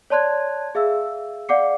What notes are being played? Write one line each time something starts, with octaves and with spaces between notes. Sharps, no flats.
C#5 D5 A5 C6 F#6 G#6
G#4 E5 F5 E6
D5 F5 F#5 D6 C7 C#7